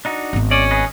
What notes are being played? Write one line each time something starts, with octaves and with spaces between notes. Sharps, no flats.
D4 D#4 F#4
G#1 B3
C#4 D5
G#4 B4 D#5